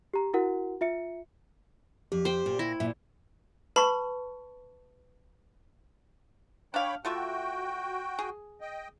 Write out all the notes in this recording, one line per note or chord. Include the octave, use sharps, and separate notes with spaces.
G4 A#5
E4 F#4 A#4 F#5
F4 E5 C#7
F2 G4
C5 G5
A#2
E4 A#6
A#2 E5
B4 A5 B5 C#6
D4 C#5 F5 G5 B5
A3 F4 F#4 E5 G5
G#4
D#5 G5